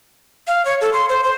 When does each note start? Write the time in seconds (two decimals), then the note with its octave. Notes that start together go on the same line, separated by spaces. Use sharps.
0.47 F5
0.65 C#5
0.81 A4
0.93 C6
1.09 C5
1.24 C5